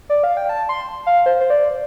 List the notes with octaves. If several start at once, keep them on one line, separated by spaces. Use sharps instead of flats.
D5
F5
G5
A5
C6
F5
C5
C5
D5